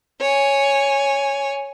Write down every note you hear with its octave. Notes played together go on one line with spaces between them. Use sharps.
C#5 G#5